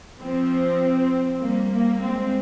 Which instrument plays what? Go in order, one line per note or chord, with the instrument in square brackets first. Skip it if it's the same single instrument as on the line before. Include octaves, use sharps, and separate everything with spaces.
[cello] F3 [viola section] C4
[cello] G3 [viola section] A#3
[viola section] A#3
[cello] G#3 [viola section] C4